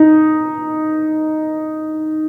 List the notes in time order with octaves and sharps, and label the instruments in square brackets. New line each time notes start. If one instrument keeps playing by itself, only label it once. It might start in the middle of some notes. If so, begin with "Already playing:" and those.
Already playing: [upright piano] D#4